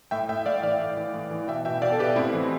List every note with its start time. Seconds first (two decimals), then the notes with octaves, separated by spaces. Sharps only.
0.11 A2 E5 G5
0.29 A2 E5 G5
0.46 A2 D5 F5
0.63 E3 D5 F5
0.80 A2
0.97 E3
1.14 A2
1.31 E3
1.48 B2 E5 G5
1.65 B2 E5 G5
1.82 B2 D5 F5
1.92 A4
1.99 B2 G4 B4
2.16 A2 C4 E4
2.34 E3